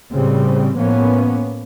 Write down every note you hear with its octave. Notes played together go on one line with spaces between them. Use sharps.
A2 C#3 G3 C4
A2 F3 A#3 B3 C#4